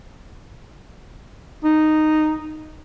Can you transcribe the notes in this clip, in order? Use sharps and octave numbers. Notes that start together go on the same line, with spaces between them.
D#4